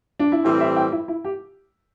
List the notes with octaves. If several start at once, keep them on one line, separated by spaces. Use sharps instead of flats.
D4
E4
A2 E3 G3 C4 G4
E5
G5
E4
E4
G4